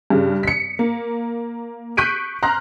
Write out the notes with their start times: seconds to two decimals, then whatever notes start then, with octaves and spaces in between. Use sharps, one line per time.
0.10 G2 C#3
0.43 B6 C#7
0.79 A#3
1.97 C#6 F#6 G6 B6 D7 D#7
2.43 A#5 C6 F6 F#6 A#6